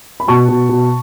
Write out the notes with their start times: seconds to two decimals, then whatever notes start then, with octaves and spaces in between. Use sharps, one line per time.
0.20 B5
0.28 B2 A5 C#6
0.48 B2
0.69 B2